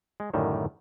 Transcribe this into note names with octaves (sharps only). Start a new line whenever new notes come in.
G#3
F#2 A2 D3 D#3 G3